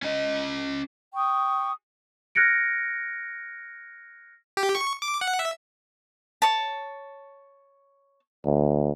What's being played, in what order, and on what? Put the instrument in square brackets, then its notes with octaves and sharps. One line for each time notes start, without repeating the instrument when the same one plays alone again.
[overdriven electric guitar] C#4 D#5
[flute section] G5 C#6 D#6
[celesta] F6 F#6 G#6 A#6 C#7 D7
[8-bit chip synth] G4
C#6
D6
F#5
E5
[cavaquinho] C#5 A5
[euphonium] D2